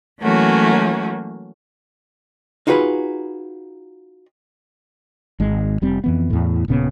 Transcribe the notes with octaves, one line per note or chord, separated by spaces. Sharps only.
E3 F#3 A3 A#3 C#4 F#4
D#4 F4 F#4 G#4 B4 B5
G#1 G#3
F1 G3 C4
F2 E3 B3
E2 A2
D#1 A#2 C#3 B3